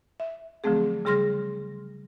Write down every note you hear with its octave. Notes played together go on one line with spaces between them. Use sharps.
E5
D3 F3 F#3 A3 C4 G#4
C#3 G3 G#4 C6 F6 A#6